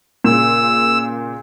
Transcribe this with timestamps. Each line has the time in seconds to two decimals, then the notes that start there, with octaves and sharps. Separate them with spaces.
0.24 A#2 C#3 E6